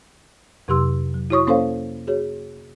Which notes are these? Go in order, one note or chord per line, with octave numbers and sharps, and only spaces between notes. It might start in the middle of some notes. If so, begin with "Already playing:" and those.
F2 C3 F#3 G4 C6 E6
F#3
E4 F#4 C#5 C#6 D#6
A#3 C#4 A4 C5 C#5 F5
F#4 G#4 C#5